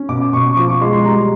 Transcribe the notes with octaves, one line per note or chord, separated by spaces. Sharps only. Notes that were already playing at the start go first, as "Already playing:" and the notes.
Already playing: C#4
B2 D6
B2 C#6
C#6
F3 D6
C#6
G#3 C6
C6
G3 A#5